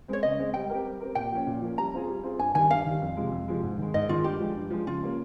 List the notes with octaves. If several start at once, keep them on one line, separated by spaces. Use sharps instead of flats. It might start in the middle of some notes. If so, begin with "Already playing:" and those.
G#3 C4 C#5
C#3 D#5
G#3 C4
G3 G5
C4 G4 A#4
G3
C4 G4 A#4
A#2 G5
F3 A#3 C#4
A#2
F3 A#3 C#4
G3 A#5
C4 F4 G#4
G3
C4 F4 G#4
G2 G#5
D#3 G3 G#5
G2 F5
D#3 G3
F2
C3 F3 G#3
F2
C3 F3 G#3
G#2
D#3 G#3
G#2 D#5
D#3 G#3 F4
G2 G4
F3 G#3
G2
F3 G#3
C#3 F4
G3 A#3 C#4